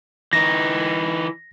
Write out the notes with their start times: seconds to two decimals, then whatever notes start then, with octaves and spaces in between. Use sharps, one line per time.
0.33 E3 D#4 A#6